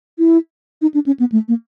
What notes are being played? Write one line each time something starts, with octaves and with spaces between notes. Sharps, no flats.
E4
D#4
D4
C#4
B3
A3
A#3